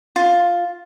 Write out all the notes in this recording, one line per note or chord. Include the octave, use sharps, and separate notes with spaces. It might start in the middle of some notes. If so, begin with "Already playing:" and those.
F4